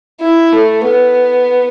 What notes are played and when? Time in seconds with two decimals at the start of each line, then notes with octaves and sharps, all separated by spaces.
0.21 E4
0.52 A3
0.85 B3